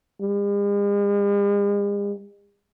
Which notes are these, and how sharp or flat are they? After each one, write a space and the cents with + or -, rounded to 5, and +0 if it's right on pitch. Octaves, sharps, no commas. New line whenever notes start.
G#3 -45